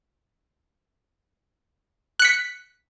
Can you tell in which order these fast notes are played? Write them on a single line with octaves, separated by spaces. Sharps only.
F#6 C#7 B6